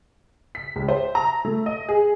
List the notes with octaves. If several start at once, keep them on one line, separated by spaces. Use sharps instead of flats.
B6
C#2
C5
A#5
A3
D#5
G#4